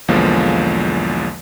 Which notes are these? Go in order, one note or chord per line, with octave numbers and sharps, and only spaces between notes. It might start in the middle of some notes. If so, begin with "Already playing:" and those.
B1 E2 D3 F3 G#3 A#3